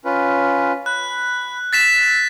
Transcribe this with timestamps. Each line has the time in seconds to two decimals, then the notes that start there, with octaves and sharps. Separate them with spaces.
0.05 C#4 F4 B4
0.86 B5 F#6
1.73 E6 A6 B6 E7